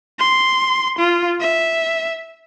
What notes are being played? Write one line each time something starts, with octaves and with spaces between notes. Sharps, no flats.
C6
F4
E5